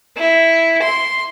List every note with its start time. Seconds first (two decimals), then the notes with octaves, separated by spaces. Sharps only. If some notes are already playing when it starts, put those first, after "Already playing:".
0.17 E4
0.83 C6